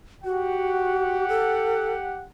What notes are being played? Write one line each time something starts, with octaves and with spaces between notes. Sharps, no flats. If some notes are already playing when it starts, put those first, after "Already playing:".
F#4 G4 F#5
A4